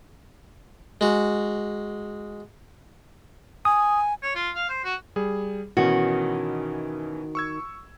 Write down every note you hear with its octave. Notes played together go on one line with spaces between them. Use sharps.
G#3 F#4
G#5 D#6
C#5
F4
F5
C5
F#4
G3 G#4
B2 D#3 E3 C#4 F#4
C#6 E6 G#6